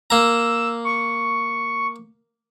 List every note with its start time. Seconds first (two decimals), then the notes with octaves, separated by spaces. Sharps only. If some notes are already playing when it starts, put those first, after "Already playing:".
0.10 A#3 A#5 E6
0.85 C#6